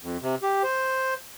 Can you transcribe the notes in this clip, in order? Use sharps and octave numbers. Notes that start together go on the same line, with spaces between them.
F2
C3
G4
C5